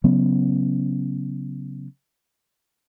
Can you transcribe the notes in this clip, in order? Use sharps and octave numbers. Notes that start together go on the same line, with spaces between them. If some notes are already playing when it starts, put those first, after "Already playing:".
C#3 F#3 B3 C#4